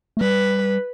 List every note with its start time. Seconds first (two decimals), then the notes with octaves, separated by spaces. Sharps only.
0.17 A3
0.20 G3 B4